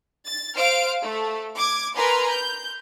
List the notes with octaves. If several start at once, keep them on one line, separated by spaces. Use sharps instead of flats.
A6
C5 F5 F6 D7
A3
D6 G#6
A#4 B4 G#5 A#5 C6
G6